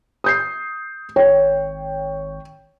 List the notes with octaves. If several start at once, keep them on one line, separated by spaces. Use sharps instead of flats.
D#6 G6 C7
G#1 C#5 G5